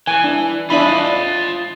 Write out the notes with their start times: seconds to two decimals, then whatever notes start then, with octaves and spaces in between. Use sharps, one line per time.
0.07 E3 G#5
0.24 D4
0.70 D4 E4 F4 D#5 B5